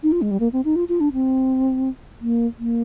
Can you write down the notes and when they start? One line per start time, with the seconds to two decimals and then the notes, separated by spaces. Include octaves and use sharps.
0.03 D#4
0.12 F4
0.22 G#3
0.31 G3
0.40 A#3
0.53 C4
0.65 D#4
0.76 F4
0.89 F4
1.00 D4
1.13 C4
2.21 A#3
2.59 A#3